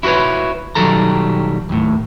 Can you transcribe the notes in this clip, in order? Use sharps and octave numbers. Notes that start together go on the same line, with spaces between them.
E4 F#4 G#4 B4 C#5
B1 D#3 F#3 G3 A4 A#5
D#2 A2